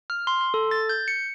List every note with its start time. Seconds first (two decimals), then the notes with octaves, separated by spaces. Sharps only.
0.10 F6
0.27 C6
0.41 C6
0.54 A4
0.71 A6
0.89 G6
1.08 C#7